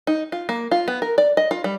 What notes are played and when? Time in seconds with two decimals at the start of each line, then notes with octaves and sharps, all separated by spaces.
0.07 D#4
0.32 F4
0.49 A#3
0.71 F4
0.88 B3
1.02 A#4
1.18 D5
1.37 D#5
1.51 F4
1.64 G3